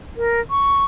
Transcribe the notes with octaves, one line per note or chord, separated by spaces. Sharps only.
A#4
C#6